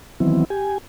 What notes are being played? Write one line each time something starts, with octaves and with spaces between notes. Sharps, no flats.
D#3 E3 F#3 B3 C4 E4
G4 G#5